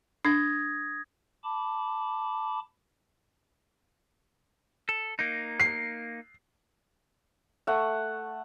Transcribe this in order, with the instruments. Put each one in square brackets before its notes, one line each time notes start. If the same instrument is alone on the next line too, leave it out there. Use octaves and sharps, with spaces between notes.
[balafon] D4 [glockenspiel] D#6 G#6 A#6
[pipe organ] A5 B5 D6
[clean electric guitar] A4
A#3 D#4
[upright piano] C7
[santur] A3 F#5